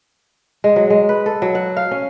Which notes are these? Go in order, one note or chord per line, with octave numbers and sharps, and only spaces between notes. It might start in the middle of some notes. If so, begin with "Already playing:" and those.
G#3
F#3
G#3
B4
A4
F#3
F#5
F5
C#4